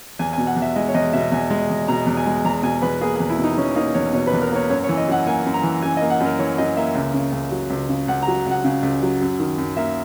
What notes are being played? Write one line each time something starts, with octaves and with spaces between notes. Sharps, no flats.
E2 G#5
G#5
B2
F#5
E2
E5
G#3 D#5
C#5
E2 D#5
B2 E5
E2 G#5
G#3
E2
B2 A#5
E2
G#5
G#3
E2 A#5
B2 G#5
E2 B4
A#3 G#4
G#4
E2
E4
B2
D#4
E2 C#4
A#3 D#4
E2 C#5
B2 C#5
B4
E2
A#4
A#3 C#5
F#2 C#5
C#5
E3
D#5
F#2 F#5
A#3 G#5
F#2
A#5
E3
F#2 G#5
D#5
A#3
F#5
F#2
A#4
E3 C#5
F#2 D#5
A#3 E5
C#2
C#3
C#2
F#3
C#2
C#3
C#2 F#5
A#5
F#3
C#2 F#5
C#3
C#2
F#3
F#2
D#3
F#2
A#3 E5